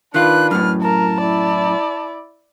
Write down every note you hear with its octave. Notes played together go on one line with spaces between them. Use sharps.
D#3 D4 F4 B4 F#6
F#2 A2 F6
A#4 A5
E4 D5